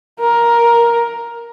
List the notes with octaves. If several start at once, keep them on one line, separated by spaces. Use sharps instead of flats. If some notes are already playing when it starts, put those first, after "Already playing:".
A#4